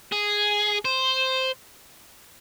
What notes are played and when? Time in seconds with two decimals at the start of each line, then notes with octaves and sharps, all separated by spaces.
0.12 G#4
0.85 C5